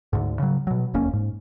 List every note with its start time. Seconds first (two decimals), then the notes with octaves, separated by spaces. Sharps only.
0.13 D2 G#2
0.39 C#3 F#3
0.67 B2 F#3
0.94 E1 D#2 A#3 C#4
1.13 G#2